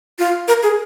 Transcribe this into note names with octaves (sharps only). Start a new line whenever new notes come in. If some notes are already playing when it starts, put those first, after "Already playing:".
F4
A#4
G#4